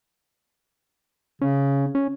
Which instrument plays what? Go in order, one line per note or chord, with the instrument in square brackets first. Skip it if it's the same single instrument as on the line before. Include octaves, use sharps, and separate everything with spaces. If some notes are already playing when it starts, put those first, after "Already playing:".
[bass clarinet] C#3 [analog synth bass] C#4
[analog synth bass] C#4